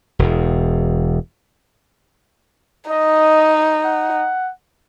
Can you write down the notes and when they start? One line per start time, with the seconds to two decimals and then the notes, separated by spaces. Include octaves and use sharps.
0.19 E1 E2
2.91 D#4 D#5
3.85 F#5